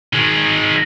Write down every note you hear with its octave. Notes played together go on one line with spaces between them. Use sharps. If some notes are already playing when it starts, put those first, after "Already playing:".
D#3 G#3